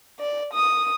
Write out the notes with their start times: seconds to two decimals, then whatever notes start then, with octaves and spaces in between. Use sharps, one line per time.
0.20 D5
0.54 D#6